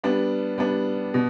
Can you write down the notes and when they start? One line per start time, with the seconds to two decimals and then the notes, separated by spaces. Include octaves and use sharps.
0.04 G3 B3 D4
0.58 G3 B3 D4
1.14 B2